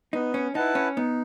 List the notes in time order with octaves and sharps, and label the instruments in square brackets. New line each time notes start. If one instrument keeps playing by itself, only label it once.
[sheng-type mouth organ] B3 [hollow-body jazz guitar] D#4
[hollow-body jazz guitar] C#4
[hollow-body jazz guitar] D#4 [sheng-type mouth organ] E4 B4 F#5 A5
[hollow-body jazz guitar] C#4
[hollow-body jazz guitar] B3 [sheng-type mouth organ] D#4